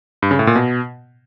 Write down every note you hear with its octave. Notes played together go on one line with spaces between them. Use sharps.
G2
C#3
A2
A#2
B2